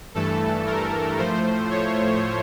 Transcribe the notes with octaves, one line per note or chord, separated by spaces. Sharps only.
G2 E3 A3 A4
A#4
A2 F3 A3 C5
C#5